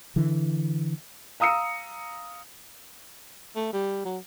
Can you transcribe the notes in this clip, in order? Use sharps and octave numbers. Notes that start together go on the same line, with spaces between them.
D3 E3
F5 A#5 D#6 E6 C#7
A3
G3
F#3